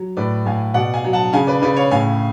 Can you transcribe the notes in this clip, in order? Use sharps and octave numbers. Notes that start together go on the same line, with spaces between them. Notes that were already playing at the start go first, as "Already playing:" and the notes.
Already playing: F#3
A2 B4 D5
A2 F5 G#5
B2 D5 F#5
F5 G#5
F#3
F#5 A5
C#3 F5 G#5
B4 D5
C#3 B4 D5
C#5 F5
A2 F5 G#5